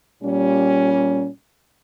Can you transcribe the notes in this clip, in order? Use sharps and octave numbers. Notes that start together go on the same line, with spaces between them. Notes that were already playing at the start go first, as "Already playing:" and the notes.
A#2 G3 C#4